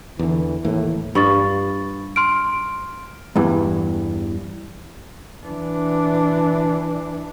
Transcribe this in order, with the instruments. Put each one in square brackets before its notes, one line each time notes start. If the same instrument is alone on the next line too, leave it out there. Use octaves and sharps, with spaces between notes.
[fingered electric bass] E2 D3 [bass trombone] E3
[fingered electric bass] D#2 E3 A#3 [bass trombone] A2
[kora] G2 F4 [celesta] B5 C#6 A6
[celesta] C6 F6 D7
[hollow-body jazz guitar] E2 G2 E3
[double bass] E3 D4